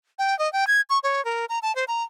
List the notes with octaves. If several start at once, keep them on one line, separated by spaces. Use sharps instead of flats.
G5
D#5
G5
G#6
C#6
C#5
A#4
A#5
A5
C5
A#5